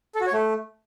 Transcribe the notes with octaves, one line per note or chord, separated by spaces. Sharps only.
A4
F#4
C#5
A3